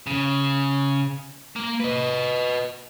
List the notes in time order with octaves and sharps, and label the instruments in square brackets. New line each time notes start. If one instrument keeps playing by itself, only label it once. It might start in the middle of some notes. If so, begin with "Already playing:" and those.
[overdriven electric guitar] C#3
A#3
B4 D#5